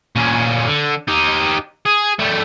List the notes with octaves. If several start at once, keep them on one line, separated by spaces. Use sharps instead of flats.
A#2 C#4
D3
D#4 G4
G#4
G3 A3